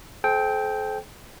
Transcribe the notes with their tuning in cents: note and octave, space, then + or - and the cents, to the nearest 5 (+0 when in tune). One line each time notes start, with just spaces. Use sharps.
A4 -40 C5 +0 G5 +0